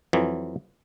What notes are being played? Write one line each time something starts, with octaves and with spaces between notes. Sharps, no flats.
F2 E3 F#3